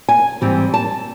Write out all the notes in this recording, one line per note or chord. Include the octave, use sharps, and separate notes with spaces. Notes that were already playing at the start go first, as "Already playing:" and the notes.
G#5
G#2 E3 G3 C4
A5